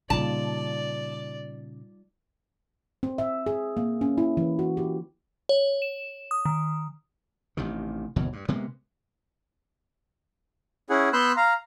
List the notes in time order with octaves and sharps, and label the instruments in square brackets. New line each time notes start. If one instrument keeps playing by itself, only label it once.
[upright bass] A#2 C#3 [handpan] G3 D#4 F4 [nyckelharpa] D5 [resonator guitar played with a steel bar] A5
[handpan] C4
E5
G#4
A#3
C#4
E4
E3
F#4
G4
[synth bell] C#5
E7
D#6
D#3
[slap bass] A1 C3 D#3
G1 D#2 B2 E3
G2
C3 G#3 A#3 B3
[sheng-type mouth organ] C#4 E4 G#4 F#5
B3 B5 C6 E6 F#6 G6
F5 A#5